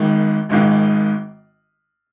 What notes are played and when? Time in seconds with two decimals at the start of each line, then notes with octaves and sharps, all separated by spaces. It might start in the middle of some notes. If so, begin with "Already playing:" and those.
Already playing: G#1 G#2 D#3 G#3 F4
0.49 G#1 G#2 D#3 G#3 F4